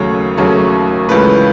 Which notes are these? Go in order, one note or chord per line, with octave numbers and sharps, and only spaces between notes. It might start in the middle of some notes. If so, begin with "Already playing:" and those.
Already playing: D#2 C#3 F#3 A3 C#5
D#2 C#3 F#3 A3
C#2 C#3 E3 A3 B4